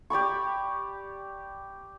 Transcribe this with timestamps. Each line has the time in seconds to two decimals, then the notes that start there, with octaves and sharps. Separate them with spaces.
0.10 G4 D5 B5 C#6